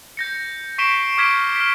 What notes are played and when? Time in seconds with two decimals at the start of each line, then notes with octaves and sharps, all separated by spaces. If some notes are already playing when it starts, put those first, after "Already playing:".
0.17 G6 A#6 C#7
0.78 C#6 B6 C7 D7 E7 G7
1.18 D6 F6 G#6 B6 D7 E7
1.56 F6 B6